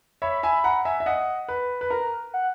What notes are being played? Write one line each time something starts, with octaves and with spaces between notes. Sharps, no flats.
C#5 E5 B5
E5 G#5
F#5 A#5
E5 G#5
E5
D#5 F#5
B4
B4
A#4 A#5
F#5